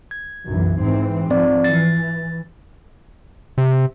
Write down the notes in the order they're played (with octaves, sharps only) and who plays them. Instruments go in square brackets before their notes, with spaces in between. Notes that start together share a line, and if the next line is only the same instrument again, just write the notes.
[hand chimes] G#6
[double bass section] B1 F#2 E3
G#2 E3 C4
[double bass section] F3 [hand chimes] C4 D5
[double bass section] E3 [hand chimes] A6
[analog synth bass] C3